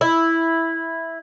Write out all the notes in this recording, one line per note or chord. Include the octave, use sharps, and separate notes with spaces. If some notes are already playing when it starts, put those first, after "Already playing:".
E4